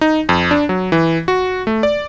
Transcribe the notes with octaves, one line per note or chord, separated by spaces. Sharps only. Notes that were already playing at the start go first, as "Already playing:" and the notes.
D#4
F2
D4
F#3
E3
F#4
A3
D5